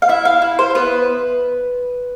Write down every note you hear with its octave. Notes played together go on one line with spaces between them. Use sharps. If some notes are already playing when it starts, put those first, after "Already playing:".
F5
E4 E5
F5
E4
C5
B3 B4